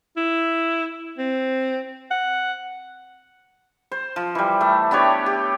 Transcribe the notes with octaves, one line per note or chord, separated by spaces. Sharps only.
E4
C4
F#5
C5
F3
E3 G3
A3
B3 D4 G4 C#5
G4